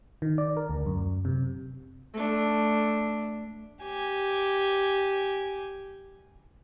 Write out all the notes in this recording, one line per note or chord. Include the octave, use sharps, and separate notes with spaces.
D#3
D5
A#4
D2
F#2
C3
A3 D4
G4 G#5